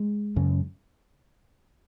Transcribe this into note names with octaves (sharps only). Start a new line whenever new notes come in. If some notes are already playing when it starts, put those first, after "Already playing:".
Already playing: G#3
F#2 C#3